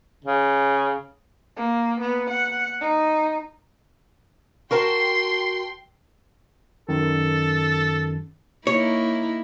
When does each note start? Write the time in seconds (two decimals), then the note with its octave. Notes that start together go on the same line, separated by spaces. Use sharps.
0.24 C#3
1.56 A#3
2.01 B3
2.30 F#5
2.81 D#4
4.71 F#4 A#4 G5 A5 C6
6.89 F#2 D#3 A4
8.67 A#3 D#4 E4 C#5